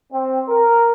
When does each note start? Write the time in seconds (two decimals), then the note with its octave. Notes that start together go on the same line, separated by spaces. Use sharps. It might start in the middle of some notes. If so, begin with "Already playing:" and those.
0.12 C4
0.49 A#4